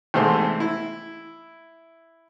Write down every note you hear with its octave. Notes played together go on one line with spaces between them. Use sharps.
E2 G#2 C3 A3 G#4 C5
E4